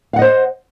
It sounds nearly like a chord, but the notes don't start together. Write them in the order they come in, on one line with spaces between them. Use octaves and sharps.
F5 F#5 D#5 C5